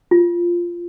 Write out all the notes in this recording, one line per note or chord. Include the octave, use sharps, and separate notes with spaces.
F4